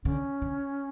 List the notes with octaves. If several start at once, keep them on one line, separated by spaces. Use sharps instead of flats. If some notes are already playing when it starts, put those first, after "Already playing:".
D3 C#4
D3